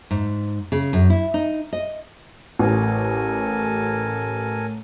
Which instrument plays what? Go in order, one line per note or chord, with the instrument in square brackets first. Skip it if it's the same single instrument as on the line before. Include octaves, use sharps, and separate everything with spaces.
[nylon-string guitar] G#2
C#3
F#2
E4
D#4
D#5
[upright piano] A1 [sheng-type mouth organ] A4 A#4 G#5